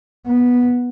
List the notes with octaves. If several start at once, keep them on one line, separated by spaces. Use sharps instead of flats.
B3